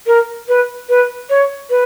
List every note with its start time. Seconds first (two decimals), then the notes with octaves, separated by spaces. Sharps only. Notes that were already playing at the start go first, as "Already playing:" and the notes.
0.07 A#4
0.48 B4
0.89 B4
1.30 C#5
1.70 B4